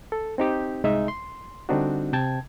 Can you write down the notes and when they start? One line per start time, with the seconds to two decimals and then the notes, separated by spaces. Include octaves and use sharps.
0.12 A4
0.38 C4 D#4 G4
0.84 C2 G#3 D#4 D#5 E5
1.08 C6
1.69 D3 G3 C4 D4 D#4 F#4
2.13 C3 G5 A5 G#6